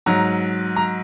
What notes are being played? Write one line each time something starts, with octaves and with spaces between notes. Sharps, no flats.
G#2 F#3 A#5
A#5